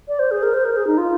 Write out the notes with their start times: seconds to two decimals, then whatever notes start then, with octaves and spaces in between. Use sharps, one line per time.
0.08 D5
0.19 C5
0.31 G#4
0.43 A#4
0.54 C5
0.65 A#4
0.76 G#4
0.87 D#4
0.98 F4